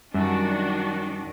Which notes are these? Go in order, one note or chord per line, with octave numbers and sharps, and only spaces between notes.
F#2 D#3 F#3 G3 D4 F#4